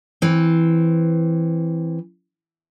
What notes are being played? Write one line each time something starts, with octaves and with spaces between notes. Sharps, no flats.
E3 C4